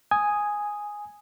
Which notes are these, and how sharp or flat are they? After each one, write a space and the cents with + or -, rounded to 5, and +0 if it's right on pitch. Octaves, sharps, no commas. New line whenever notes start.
G#5 +0 D#6 +0